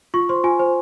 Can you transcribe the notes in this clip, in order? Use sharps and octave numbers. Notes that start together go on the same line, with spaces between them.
F4 C#6
C5 C6
F4 G#5
C5